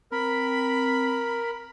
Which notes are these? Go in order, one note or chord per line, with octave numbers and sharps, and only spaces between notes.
C4 A#4 B5